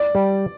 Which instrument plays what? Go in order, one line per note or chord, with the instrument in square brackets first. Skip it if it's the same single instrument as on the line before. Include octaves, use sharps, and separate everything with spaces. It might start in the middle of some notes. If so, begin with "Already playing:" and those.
Already playing: [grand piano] D5
[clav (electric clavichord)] G3